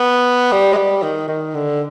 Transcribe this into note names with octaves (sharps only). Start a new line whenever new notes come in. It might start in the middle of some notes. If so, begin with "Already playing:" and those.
Already playing: B3
G3
G#3
G3
D#3
D#3
D3